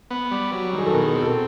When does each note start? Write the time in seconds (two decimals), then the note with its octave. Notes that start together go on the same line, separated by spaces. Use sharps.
0.11 B3
0.31 G3
0.52 F#3
0.73 D#3
0.78 G#4
0.86 A4
0.94 B2 A#4
1.15 C4
1.22 A4